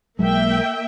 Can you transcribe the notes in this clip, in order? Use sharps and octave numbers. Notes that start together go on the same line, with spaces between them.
B1 F#3 G#3 A#3 E5 G5